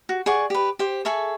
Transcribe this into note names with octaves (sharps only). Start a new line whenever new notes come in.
F#4
G#4 D5 F#5 C#6
G4 B4
G4 C5
G#4 A4 E5 C#6